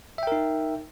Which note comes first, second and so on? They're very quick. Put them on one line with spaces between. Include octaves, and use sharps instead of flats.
E5 G5 A#4 D#4